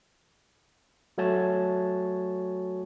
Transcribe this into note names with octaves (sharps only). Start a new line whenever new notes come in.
F#3 A3 F#4 C#5 G#5 A5